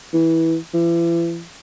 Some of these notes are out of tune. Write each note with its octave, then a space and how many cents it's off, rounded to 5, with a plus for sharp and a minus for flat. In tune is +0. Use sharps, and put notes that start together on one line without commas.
E3 -15
E3 +40